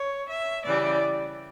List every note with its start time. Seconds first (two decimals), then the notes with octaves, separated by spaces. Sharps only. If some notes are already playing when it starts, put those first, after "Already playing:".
Already playing: C#5
0.29 E5
0.65 C#3 E3 G3 D5